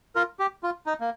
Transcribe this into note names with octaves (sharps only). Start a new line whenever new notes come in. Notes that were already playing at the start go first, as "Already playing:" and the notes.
F4 A#4
G4
F4
D#4
A#3